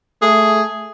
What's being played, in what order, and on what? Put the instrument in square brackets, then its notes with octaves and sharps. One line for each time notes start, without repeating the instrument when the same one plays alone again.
[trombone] A3 [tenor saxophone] G#4